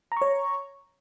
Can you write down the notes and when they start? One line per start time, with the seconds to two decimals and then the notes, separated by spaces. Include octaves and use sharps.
0.12 A#5
0.17 C#6
0.22 C#5